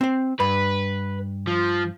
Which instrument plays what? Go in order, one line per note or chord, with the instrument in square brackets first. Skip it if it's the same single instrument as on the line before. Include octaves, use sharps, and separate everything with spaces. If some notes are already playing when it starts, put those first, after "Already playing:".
[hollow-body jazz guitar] C4 C5
[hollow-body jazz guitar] G2 B5 [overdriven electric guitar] B4
[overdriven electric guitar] F3